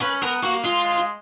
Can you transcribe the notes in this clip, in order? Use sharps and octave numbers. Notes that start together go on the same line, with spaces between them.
C#4 B4
B3 A#4
A#3 F#4
G#3 F4
G#3